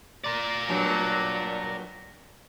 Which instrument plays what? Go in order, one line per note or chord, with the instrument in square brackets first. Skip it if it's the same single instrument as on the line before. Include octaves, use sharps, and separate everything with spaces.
[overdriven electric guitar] A#4 D5
[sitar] G2 A#2 F#3